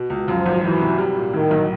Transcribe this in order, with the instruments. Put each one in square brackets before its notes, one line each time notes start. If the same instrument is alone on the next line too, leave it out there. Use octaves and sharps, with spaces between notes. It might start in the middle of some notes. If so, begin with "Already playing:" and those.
Already playing: [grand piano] B2
C#2
[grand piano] F#2 [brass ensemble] F3
[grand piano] G#1
[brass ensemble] E3 [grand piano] F#3
[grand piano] C3
G3
A#2
[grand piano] A2 [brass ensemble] D#3
[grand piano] B1